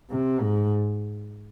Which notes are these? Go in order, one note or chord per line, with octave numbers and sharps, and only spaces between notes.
C3
G#2